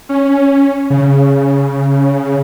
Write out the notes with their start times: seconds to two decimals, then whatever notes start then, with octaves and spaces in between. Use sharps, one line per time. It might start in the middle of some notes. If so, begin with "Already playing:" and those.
0.09 C#4
0.90 C#3